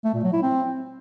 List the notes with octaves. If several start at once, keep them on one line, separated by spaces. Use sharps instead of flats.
A3
A#2
F#3
E4
C4